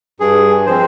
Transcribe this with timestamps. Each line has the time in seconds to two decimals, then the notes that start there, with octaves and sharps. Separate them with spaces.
0.20 G2 G#4
0.66 F3 G#3 C4 C5